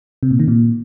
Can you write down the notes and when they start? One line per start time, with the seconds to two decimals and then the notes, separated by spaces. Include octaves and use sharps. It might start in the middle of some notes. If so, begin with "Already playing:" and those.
0.23 C3
0.31 A#2
0.40 D#3
0.48 A#2